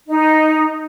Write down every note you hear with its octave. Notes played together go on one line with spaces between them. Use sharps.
D#4